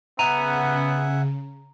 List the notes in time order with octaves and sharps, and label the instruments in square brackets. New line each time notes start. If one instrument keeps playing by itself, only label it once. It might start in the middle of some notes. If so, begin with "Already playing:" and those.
[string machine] C#3 [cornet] B3 [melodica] E5 F#5 G#5 [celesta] A#5 D#7 F7